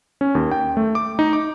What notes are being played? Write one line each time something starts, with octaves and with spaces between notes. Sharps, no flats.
C#4
D#2
G5
A3
D6
D#4
D6